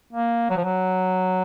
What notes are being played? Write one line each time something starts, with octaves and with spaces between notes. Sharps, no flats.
A#3
F#3
F3
F#3